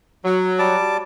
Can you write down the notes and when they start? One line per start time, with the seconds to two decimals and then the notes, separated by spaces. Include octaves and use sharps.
0.25 F#3
0.59 G3 A5 D6